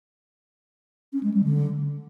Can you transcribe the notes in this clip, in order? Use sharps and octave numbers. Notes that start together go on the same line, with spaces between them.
C#4
G#3
G3
D3